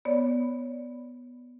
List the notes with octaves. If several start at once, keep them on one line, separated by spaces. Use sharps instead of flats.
B3 C#5 D5